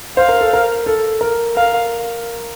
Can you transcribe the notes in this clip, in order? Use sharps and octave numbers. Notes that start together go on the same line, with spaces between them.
C5 F5
A#4
A4
A#4
A4
A#4
A#4 F5